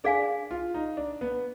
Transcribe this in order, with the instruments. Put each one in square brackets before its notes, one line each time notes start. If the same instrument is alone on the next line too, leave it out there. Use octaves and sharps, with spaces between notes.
[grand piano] D4 [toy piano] G#4 D5 F5 G#5
[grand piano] F4
D#4
D4
B3